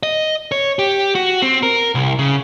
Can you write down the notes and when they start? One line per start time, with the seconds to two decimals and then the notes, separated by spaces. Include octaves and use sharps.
0.03 D#5
0.52 C#5
0.79 G4
1.15 F#4
1.42 C4
1.63 A#4
1.95 C2
2.19 C#3